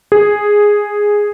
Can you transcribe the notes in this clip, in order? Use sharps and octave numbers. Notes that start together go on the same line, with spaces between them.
G#4